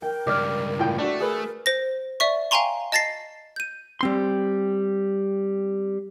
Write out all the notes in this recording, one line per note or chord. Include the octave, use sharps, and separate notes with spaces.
A#4 G5
C#2 G2 D5 F6
A2 F4 G5
A3 D4 F#4
G#4 A#4 B4
C5 A#6
D5 E5 C#6
F5 G5 G#5 A#5 C6 C#6
D#5 A5 A6 A#6 C7
G6 D#7
G3 C4 C6